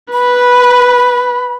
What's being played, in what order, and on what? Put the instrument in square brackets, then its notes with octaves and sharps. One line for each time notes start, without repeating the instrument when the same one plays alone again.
[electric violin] B4 [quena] B5